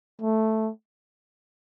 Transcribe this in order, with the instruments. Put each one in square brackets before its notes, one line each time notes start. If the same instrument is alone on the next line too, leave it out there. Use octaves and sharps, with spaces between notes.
[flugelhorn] A3